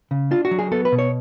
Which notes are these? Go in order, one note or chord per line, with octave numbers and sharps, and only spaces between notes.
C#3
D4 F4
F#4
F#3
G#4
B3 A4
B4
B2
C#5